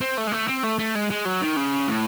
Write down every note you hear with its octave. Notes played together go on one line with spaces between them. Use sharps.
C4
A3
G#3
A3
C4
A3
A3
G#3
G#3
F#3
D#3
C#3
A2